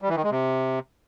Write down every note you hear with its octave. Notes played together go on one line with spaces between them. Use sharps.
G3
E3
D#3
G#3
C3